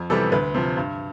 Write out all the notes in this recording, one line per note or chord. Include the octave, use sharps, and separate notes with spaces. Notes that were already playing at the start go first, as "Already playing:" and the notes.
Already playing: F2
C3 E3 G3 B3 A4
D2 B4
C3 F3
G2